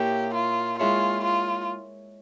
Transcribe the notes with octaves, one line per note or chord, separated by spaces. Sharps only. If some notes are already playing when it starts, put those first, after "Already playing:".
Already playing: A#2 A#3 E4 G4 A#4 C#5 E5
F4
G#3 E4 F4 G#4 C#5 E5
F4